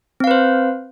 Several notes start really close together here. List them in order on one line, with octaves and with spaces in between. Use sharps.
C4 F5 B4 C5